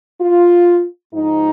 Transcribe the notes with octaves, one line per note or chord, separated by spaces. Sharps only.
F4
G#2 F3 D#4